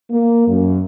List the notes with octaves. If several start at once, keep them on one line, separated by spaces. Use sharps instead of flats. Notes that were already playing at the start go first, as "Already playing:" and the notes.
A#3
F#2